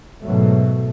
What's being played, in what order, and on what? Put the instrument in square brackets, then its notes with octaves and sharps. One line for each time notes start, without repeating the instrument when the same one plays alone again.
[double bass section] G#2 B2 F#3 A3